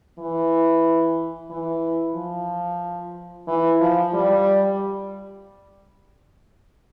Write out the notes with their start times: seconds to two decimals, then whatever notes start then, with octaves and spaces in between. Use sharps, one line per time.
0.19 E3
1.50 E3
2.15 F3
3.48 E3
3.81 F3
4.14 G3